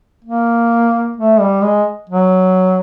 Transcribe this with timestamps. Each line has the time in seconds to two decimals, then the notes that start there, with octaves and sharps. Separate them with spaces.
0.24 A#3
1.17 A3
1.40 G3
1.63 G#3
2.09 F#3